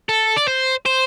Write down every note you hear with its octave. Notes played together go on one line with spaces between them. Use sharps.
A4
D5
C5
C5